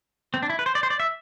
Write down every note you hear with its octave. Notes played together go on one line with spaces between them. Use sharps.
C4
D4
E4
B4
C5
D5
C5
D5
E5